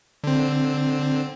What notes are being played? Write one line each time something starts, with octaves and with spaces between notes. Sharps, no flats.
D3 C4